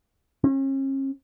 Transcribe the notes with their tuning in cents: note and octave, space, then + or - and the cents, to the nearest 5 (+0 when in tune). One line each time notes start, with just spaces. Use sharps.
C#4 -40